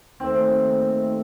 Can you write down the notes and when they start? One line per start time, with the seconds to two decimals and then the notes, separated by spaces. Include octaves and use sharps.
0.20 D#2 D#3 A3 C4